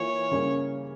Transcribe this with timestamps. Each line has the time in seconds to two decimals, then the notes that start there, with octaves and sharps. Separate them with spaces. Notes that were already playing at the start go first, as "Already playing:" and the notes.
Already playing: E3 A#3 F4 C#5
0.31 C#3 G3 A#3 C#4